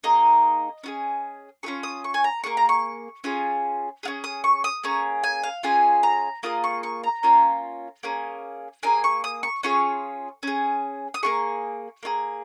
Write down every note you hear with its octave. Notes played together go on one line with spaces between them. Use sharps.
A#3 D#4 G#4 D#5
C#4 F4 G#4
C#4 F4 G#4 C#6
D#6
C#6
G#5
A#5
A#3 D#4 G#4 C#6
A#5
C#6
C#4 F4 G#4
C#4 F4 G#4
D#6
C#6
D#6
A#3 C#4 G#4 C#6
G#5
F5
C#4 F4 G#4 G#5
A#5
A#3 F4 G#4 D#6
C#6
C#6
A#5
A#3 C#4 F4
A#3 C#4 G#4
A#3 D#4 G#4 G#5
C#6
D#6
C#6
C#4 F4 G#4 C#6
C#4 G#4
D#6
A#3 F4 G#4 C#6
A#3 F4 G#4